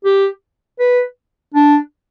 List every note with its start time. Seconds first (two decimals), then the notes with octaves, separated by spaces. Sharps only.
0.05 G4
0.79 B4
1.54 D4